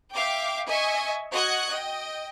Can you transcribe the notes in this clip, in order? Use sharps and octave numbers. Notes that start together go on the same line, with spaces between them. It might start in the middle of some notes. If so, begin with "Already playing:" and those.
E5 F5 G5 D6
D#5 E5 G#5 C#6
F#4 D#5 F#5 F#6 G#6
D#5 G5